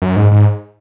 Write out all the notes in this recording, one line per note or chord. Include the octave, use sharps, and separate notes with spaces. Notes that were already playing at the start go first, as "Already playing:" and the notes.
F#2
G#2
G#2